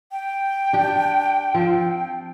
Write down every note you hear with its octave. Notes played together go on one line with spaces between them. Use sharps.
G5
D4 G4
F3 C4